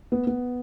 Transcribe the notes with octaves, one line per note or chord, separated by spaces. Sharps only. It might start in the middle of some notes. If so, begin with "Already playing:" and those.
B3
B3